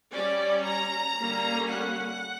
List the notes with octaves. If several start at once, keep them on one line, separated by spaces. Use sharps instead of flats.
G3 C#4 D5
A#5
D3 G3 A#3 C#4
F#5